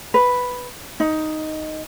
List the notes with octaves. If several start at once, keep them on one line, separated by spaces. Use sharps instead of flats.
B4
D#4